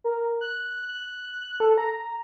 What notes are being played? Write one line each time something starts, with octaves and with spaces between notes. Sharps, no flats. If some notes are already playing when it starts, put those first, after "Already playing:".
A#4
F#6
A4
A#5